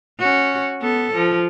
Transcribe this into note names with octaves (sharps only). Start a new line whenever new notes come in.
C#4 F#4
B3 A4
F3